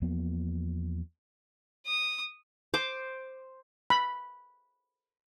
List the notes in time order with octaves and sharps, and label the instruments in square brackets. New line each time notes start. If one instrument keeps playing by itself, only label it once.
[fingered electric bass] E2 F3 A#3 B3
[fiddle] D#6
[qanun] C5 D6
[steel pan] B5